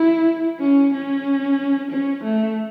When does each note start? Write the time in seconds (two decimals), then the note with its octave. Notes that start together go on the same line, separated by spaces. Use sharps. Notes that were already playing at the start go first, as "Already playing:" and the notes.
Already playing: E4
0.60 C#4
0.93 C#4
1.91 C#4
2.24 A3